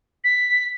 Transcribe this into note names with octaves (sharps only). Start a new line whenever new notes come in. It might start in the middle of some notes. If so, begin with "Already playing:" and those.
B6